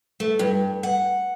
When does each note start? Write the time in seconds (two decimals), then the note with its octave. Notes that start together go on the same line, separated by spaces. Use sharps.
0.20 A3
0.39 G2
0.83 F#5